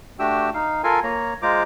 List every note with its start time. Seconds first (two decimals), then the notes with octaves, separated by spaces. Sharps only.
0.19 A3 D4 F#4 G4 G5 E6
0.54 D#4 F5
0.84 F4 A4 A#4 F5 G#5
1.04 A#3 C#5 A#5
1.42 G#3 F4 C5 A#5 D6